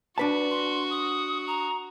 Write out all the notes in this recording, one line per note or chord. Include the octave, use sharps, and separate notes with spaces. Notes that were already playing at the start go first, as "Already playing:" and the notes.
D4 F#4 B4 A5
C6
D#6
A#5